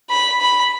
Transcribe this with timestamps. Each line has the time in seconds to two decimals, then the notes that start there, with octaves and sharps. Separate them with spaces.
0.10 B5
0.41 B5